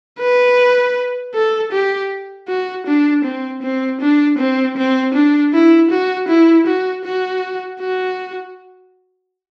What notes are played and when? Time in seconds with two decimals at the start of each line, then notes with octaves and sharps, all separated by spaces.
0.20 B4
1.34 A4
1.72 G4
2.48 F#4
2.86 D4
3.24 C4
3.62 C4
4.01 D4
4.39 C4
4.77 C4
5.14 D4
5.53 E4
5.91 F#4
6.29 E4
6.66 F#4
7.05 F#4
7.80 F#4